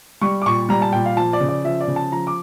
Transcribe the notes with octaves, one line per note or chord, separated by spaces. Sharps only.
G3 C#6
D6
A#2 C#6
G3 A#5
A5
A#2 G5
F5
F3 A5
D5
C#3
D5
F3 E5
D5
C#3
A5
F3 A#5
D6